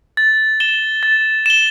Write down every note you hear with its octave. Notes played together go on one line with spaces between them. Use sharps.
A6
E7 G7
A6
E7 G7